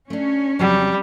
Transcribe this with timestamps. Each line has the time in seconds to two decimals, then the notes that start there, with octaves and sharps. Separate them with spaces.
0.10 A3 C#4 D4
0.59 F2 C#3 F#3 G3